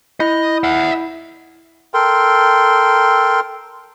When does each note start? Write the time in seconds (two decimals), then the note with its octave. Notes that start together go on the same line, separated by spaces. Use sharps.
0.20 E4 D#5 B5 G6
0.64 E5 F#5
1.94 A4 A#4 G5 C6